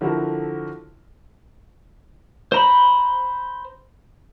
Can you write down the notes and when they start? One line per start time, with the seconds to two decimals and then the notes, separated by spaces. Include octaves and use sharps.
0.01 D3 F3 E4 F#4 A4 A#4
2.52 C5 A#5 B5